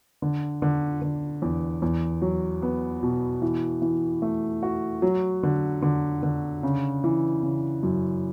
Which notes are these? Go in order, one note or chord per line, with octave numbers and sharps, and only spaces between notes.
D3
D3
D3
E2
E2
F#3
B3
B2
E3
E3
A3
F#4
F#3
D3
D3
D3
C#3
E3
C#3
F#2